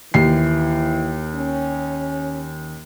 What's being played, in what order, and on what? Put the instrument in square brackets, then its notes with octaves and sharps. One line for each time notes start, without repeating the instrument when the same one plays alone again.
[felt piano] D#2 C7 [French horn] E3
[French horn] C#4